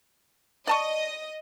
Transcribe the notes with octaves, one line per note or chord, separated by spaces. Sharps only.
D5 D#5 A5 C#6